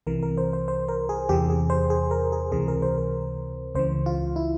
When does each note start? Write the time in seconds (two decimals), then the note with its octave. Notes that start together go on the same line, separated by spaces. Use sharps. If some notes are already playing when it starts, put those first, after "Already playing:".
0.07 C2 C3 E3 A#4
0.23 A#4
0.37 C5
0.53 C5
0.68 C5
0.88 A#4
1.09 G#4
1.29 E2 C3 E3 G4
1.50 G#4
1.70 C5
1.90 G#4
2.11 A#4
2.32 G#4
2.52 C#2 C3 E3 G#4
2.68 A#4
2.82 C5
2.98 A#4
3.75 C#2 C#3 E3 C5
4.06 F4
4.36 E4